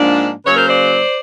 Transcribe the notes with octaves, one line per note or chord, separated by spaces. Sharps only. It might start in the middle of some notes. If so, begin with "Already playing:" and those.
Already playing: G#2 F3 A#3 D4
C#3 F#3 A#3 B4 C#5
A#4 C5
C5 D5